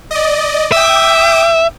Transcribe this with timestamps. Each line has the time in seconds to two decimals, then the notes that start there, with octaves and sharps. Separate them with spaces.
0.11 D5 D#5
0.72 E5 G5 D6 D#6